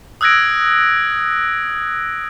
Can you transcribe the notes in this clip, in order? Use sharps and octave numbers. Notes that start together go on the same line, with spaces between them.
D#6 E6 F#6 G#6 A#6 D7